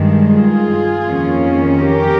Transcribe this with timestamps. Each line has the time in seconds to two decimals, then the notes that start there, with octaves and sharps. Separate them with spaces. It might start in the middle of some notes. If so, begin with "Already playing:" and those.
Already playing: G2 D#3 G#3
0.29 F4 G#4
1.05 F2 D#3 A#3 C#4
1.82 G4 A#4